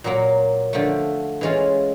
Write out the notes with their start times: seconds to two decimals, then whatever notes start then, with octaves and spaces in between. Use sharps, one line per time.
0.04 A#2 F#3 A#3
0.73 D3 F3 A3
1.41 E3 G#3 C#4 F4